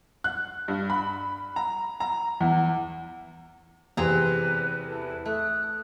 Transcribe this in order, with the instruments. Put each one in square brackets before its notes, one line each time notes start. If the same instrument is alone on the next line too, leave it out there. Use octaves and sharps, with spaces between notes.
[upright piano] F#6
G2
B5
A#5
A#5
E2
[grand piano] E2 C3 [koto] C4 G#4 A#5 [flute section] B4
[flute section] E4 A4 B4
[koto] A3 [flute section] D#6 F#6